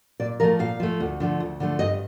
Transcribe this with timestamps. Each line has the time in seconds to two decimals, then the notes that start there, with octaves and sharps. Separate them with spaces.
0.20 A#2 D5
0.40 F3 A3 A#4
0.59 A#2 F5
0.80 F3 A3
1.00 D2
1.20 D3 F3 A3
1.40 D2
1.60 D3 F3 A3
1.79 G2 D#5